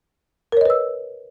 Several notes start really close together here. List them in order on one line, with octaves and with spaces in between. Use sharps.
A#4 C#5 D#5 B4 E6